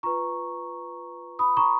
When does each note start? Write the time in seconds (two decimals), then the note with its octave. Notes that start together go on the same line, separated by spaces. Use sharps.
0.03 F4 B4 A#5 C#6
1.39 B5 D#6
1.57 A#5 C#6